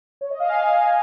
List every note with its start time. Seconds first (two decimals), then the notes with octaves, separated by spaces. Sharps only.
0.21 C#5
0.31 D#5
0.40 F5
0.49 G#5
0.58 D#5